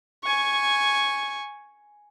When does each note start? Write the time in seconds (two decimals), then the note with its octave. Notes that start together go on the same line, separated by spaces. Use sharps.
0.23 G#5 C#6